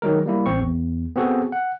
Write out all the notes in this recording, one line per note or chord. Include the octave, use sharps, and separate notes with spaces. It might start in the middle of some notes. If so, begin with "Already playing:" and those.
D#3 F#3 G#3 A#4
G3 A#3 E4
A1 C4 C#6
E2
B3 C4 F#4 G#4 A4
F#5